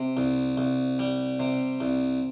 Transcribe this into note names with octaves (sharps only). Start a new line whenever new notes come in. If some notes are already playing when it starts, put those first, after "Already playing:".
Already playing: C3
C2
C2
G3
C3
C2